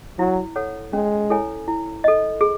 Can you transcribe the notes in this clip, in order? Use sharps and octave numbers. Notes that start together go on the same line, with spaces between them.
F#3 E4
A4 C#5 F#5
G#3 C#4
E4 A4 C#5 G#5
E4
A4 D#5
G#4